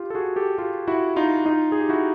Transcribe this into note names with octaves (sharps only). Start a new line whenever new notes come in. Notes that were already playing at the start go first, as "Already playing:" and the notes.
Already playing: F4 G4
A4
F#4 G#4
G4 A4
F4 G4
E4 F#4
D#4 F4
D#4 F4
G#4
G4
E4 F#4